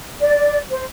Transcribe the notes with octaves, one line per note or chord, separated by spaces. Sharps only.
D5
C5